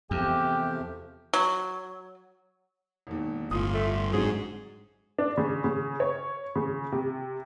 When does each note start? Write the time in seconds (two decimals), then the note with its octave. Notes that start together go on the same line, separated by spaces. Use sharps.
0.11 E2 C3 F3 A3 G4
1.34 F#3
3.07 E1 D#2
3.51 G1 A2 F4 D#6
3.74 A3
4.13 G#2 D3 F#3 G#3 C4 G#4
5.18 D4
5.37 C#3
5.64 C#3
6.00 C#5
6.56 C#3
6.92 C3